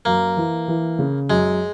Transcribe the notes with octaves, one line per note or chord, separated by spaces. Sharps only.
F#2 A#3
E3
E3
C#3
F#2 G#3